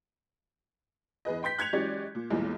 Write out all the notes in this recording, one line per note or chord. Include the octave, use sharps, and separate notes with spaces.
E2 G#4 B4 D#5
G5 C6 G6 B6
F#6 G#6 C#7 F7
E3 F#3 G#3 C#4 G4 D5
A#2
B1 E2 A#2 E3 G3 G#3